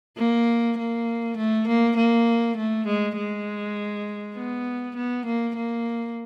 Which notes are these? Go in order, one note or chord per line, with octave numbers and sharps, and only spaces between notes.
A#3
A#3
A3
A#3
A#3
A3
G#3
G#3
B3
B3
A#3
A#3